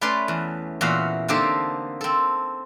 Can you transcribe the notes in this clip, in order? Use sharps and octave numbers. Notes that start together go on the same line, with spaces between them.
A3 C#4 B4 D5 C6
E2
E2 A#2 F#4 E5 F5
D3 A#3 C4 D#4 G4 A4
C4 A4